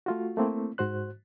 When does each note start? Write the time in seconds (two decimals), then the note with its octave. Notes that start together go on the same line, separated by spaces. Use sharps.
0.06 A3 F4 F#4
0.37 A3 A#3 C4 E4
0.78 G#2 F#4 C5 F#6